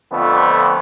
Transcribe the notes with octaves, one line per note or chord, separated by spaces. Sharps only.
F2 D3 F3 A3 B3